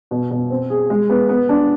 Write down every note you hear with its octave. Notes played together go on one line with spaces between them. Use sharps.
B2
B2
C4
G#4
G#3
B3
B3
D4